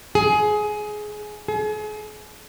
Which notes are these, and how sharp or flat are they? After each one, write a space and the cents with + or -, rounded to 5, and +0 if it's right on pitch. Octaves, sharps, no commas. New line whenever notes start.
G#4 +20
G#4 +40